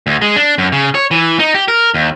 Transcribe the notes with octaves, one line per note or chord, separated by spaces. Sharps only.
D2
G#3
D4
F#2
C#3
C#5
E3
D#4
G4
A#4
D#2